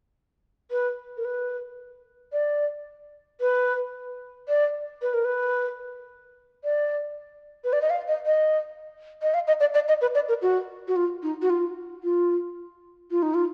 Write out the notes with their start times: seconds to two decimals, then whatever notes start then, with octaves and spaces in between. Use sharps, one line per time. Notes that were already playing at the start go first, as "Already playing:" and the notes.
0.71 B4
1.17 A#4
1.25 B4
2.33 D5
3.41 B4
4.48 D5
5.02 B4
5.14 A#4
5.25 B4
6.64 D5
7.64 B4
7.73 D5
7.82 D#5
7.90 F5
8.08 D#5
8.26 D#5
9.22 D#5
9.34 F5
9.47 D#5
9.60 D5
9.74 D5
9.88 D#5
10.01 B4
10.15 D5
10.28 A#4
10.42 F#4
10.88 F#4
10.96 F4
11.23 D#4
11.42 F#4
11.50 F4
12.03 F4
13.11 F4
13.22 D#4
13.34 F4